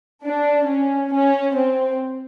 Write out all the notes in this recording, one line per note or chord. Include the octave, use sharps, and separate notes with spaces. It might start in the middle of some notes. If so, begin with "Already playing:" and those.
D4
C#4
C#4
C4